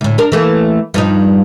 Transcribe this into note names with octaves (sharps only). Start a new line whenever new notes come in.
D2 A2
D4 A#4
E3 A3 A#3
G2 F3 D#4